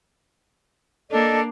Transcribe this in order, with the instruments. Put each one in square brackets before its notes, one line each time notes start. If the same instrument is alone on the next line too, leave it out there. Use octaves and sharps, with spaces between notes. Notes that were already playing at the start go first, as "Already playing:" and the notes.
[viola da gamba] A#3 D4 [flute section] A4 D5 D#5